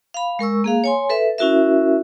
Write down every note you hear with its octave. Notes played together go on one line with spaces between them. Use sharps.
F5 B5
G#3 A#4 C#6 E6
A#3 G#4 F5
C#5 G#5 C6
A4 B4 E5
C#4 E4 F#4 A#4 E5